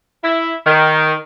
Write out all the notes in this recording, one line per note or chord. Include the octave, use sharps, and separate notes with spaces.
E4
D#3